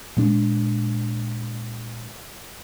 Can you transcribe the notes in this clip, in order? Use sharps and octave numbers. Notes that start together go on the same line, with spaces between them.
A#2 G#3 D4